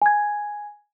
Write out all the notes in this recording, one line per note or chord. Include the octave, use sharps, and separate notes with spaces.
G#5 G#6